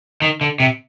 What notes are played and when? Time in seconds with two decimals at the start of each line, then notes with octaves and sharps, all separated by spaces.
0.22 D#3
0.41 D3
0.60 C3